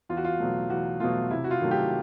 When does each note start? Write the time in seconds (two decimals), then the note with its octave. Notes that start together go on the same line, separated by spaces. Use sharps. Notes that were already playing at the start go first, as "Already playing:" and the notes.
0.09 E2 F4
0.17 F#4
0.25 F4
0.40 B2 F#3 A3
0.70 E2 F#4
1.00 B2 F#3 A3 F4
1.31 C3 E4
1.44 F#4
1.51 F4
1.61 D#3 F#3 A3
1.71 G4